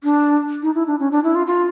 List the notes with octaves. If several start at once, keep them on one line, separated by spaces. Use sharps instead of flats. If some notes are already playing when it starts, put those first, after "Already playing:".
D4
D#4
E4
D4
C#4
D4
E4
F4
F4